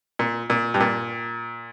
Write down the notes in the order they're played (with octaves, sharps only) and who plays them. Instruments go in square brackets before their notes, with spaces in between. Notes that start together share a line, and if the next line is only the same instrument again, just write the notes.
[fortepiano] A#2
A#2
G2
A#2